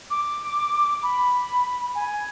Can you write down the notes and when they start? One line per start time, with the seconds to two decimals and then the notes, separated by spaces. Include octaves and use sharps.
0.11 D6
1.03 B5
1.95 G#5